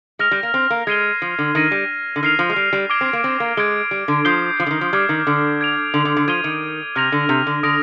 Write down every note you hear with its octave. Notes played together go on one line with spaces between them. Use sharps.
G#3 F6 A#6 F7
G3
A#3
C4
A#3
G#3 G#6 C7 D#7 G7
F3
D3
D#3 F6 A#6 D#7
G3
D3
D#3 F6 C7 F7
F3
G#3
G3
G3
D6 G#6 D7 G7
C4
A#3
C4
A#3
G#3 G#6 D7 G7
G3
D3
F3 D#6 G6 C7 G7
F3
D3
D#3
F3
G3 D6 F6 G#6
D#3
D3
G#6 D7 F7
D3
D3
D3
F3 G#6 D#7 G7
D#3
C3 F6 A#6 F7
D3
C3
D3
D3 D#6 A#6 D7